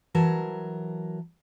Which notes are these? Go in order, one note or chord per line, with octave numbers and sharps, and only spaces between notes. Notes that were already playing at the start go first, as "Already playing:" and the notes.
E3 F#3 A#4 A5